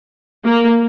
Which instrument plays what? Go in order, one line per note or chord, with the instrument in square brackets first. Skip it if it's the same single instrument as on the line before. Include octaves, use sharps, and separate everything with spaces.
[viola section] A#3